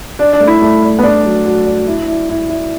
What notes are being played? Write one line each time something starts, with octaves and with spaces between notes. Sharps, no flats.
D4 D5
D4
A3
E4
A3
D5
B3
D4 D5
F#3
F#4
D5
E4
E4
E4
E4